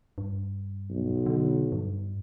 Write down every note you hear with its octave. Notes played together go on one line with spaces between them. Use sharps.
G2
B1
D3
G2